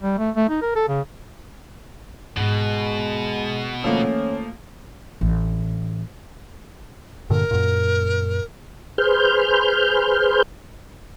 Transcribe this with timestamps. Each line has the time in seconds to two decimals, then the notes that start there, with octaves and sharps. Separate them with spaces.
0.02 G3
0.18 A3
0.36 A3
0.49 D#4
0.62 A#4
0.76 A4
0.88 C#3
2.37 G#2 B2 G#3 C#4
3.84 D#3 F3 A3 A#3 C#4
5.21 A1
7.30 G2 A#2 D3 A#4
7.51 F#2 A#2
8.98 G#4 B4 C5 F6 G6